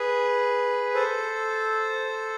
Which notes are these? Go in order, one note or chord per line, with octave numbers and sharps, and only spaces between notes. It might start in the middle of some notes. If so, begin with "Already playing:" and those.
Already playing: G#4 B4
A4 C5